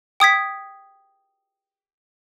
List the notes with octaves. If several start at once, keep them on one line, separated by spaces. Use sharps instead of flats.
G5 D#6 G#6 B6